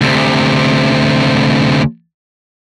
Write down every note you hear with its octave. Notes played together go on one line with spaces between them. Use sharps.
D2 C3